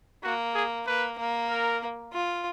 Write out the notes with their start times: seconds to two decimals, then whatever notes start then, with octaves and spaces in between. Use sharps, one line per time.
0.24 A#3 F#4
0.55 G#4
0.87 A#3 B4
1.18 A#3
1.49 A#4
2.13 F4